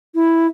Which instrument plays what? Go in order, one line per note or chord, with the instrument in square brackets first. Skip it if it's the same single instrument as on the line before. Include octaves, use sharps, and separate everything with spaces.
[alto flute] E4